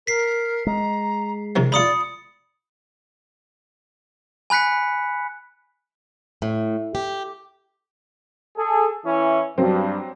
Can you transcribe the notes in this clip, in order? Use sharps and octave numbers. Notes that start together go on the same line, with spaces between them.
A#4 B6 C7
G#3 A#5
C3 D#3 F3
D#4 F4 D5 B5 D#6 C#7
G#5 B5 F#6 B6 C#7
A2
G4
G#4 A4
E3 C#4 E4
G2 F#3 C4